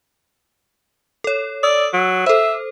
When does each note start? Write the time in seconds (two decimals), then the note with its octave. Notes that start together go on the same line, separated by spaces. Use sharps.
1.24 A4 C#5
1.63 D5 D#6 E6
1.93 F#3
2.26 A4 C5 E5